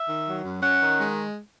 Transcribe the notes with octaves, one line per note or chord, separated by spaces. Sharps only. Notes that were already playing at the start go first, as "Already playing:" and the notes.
Already playing: E5
D#3
F#3
F#2
C#4 F#5
D#3
G#3